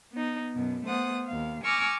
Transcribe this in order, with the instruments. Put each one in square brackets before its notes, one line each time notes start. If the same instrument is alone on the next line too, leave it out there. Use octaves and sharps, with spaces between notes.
[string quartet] B3 D#4
F#2 B2
A3 B3 C5 F#5 D#6
D#2 F5
G#5 C#6 D6 E6 F6 A#6